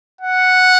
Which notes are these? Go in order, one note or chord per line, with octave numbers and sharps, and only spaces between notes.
F#5